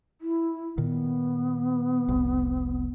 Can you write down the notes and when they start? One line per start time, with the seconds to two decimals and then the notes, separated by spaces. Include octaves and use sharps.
0.21 E4
0.78 A#2 D#3 B3
2.09 F1 C2